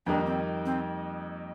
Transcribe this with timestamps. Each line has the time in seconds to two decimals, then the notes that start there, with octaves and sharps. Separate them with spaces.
0.06 F2 D#3 G3 A#3 D4 D#4
0.26 C4
0.65 C4